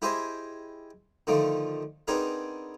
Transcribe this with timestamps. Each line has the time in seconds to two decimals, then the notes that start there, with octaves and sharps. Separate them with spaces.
0.02 E4 G4 G#4 C5 D#5 E5
1.27 D3 D#3 F3 A3
2.08 B3 C4 D4 D#4 G#4 A#4